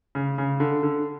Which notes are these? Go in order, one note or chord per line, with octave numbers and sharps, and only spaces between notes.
C#3
C#3
D3
D3